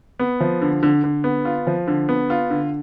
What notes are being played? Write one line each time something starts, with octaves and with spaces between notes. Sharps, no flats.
B3
F3
D3
D3
D3
B3
F4
F3
D3
B3
F4
D3